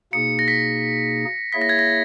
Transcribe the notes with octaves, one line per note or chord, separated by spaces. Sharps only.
B2 A#3 D#4 G#4 C#7
A#6
B6
A#3 E4 G#4 C#5 E5 B6
A#6
G#6
A#6